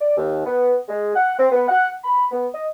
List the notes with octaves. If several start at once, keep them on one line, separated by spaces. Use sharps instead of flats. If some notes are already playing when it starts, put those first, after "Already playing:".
D5
D#2
B3
G#3
F#5
C4
B3
F#5
B5
B3
D#5